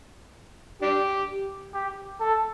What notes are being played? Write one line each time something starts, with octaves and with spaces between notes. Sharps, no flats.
D4 G4
G4
A4